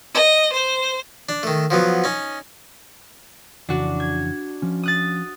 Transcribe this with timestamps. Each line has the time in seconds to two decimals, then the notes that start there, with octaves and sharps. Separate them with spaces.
0.14 D#5
0.53 C5
1.29 D4
1.43 D#3 A3
1.70 F3 F#3 B3
2.04 C#4 D#4
3.69 F2 C#3 E3 D4 F#4
4.00 G#6
4.62 F3 C#4
4.83 D#6 F#6 A6